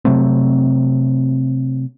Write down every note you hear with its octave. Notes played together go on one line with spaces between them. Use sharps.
C3 F#3 A3 C4